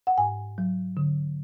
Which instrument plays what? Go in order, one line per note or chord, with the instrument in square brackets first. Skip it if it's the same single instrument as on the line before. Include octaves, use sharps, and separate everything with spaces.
[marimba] F#5
G#2 G#5
F#3
D3